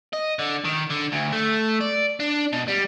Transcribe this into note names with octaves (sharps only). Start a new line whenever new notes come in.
D#5
D3
D#3
D3
D2
A3
D5
D4
B2
G3